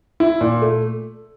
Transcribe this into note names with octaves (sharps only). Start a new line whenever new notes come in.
E4
A#2
A3